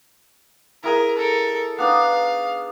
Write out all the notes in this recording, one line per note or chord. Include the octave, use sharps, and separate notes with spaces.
E4 G#4 A#4 G#5
A4 A#4
B3 D4 D#4 F5